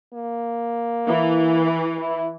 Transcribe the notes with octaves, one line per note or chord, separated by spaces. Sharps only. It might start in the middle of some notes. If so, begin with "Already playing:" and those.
A#3
E3
E4